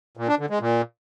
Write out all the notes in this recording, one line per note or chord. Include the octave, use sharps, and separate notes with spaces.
A#2
D4
D3
G#3
A#2